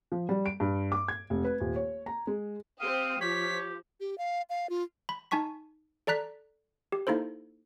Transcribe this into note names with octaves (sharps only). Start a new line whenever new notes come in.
F3
G3
D7
G2
D6
G#6
F1
B4
D#1
C#5
A#5
G#3
C4 G4 F5 D#6
F3 G4 C#5 B6
G4
F5
F5
F4
B5
D#4 G#5 A5 C#6 B6
A4 D5 A#5 F#6 B6
G4
A#3 D#4 E4 A4 C5